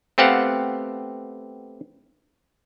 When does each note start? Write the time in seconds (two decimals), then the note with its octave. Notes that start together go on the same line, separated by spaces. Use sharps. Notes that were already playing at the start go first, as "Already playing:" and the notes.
0.18 A3 B3 C4 G4 F5 F#5